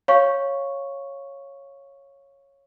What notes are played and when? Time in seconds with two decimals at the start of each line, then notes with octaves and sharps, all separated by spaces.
0.08 C#5 F5 C#6